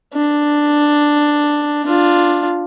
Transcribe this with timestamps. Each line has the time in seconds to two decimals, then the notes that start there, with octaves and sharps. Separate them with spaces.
0.14 D4
1.86 D4 F4